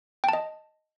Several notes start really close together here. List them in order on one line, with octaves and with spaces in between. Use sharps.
G5 A5 D#5